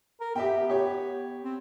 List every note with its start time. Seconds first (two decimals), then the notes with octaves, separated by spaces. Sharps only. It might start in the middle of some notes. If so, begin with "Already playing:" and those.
0.20 A#4
0.36 B3 G4 E5 G5
0.70 G4 C#5
1.43 C4